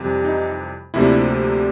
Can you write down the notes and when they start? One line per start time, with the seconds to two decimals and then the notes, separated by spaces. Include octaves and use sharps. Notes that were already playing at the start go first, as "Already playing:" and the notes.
Already playing: F2 C3 E3 G3
0.25 D#4
0.94 D2 C3 F3 A#3 D4 E4